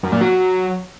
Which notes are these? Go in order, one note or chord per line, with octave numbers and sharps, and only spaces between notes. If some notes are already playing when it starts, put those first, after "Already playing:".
F#2
A#2
F#3